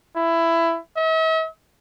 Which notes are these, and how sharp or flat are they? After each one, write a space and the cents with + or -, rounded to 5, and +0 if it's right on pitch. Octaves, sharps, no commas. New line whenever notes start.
E4 +15
E5 -45